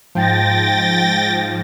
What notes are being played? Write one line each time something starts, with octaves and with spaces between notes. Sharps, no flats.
G#2 F3 G5 A6 A#6